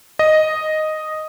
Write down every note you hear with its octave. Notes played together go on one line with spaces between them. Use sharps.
D#5